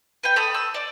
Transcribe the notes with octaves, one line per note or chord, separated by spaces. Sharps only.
B4 G5
A4 B5 D#6
E6
D5